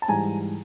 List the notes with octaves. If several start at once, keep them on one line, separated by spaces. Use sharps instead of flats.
A5
G#2 E3 G3 G#5 A#5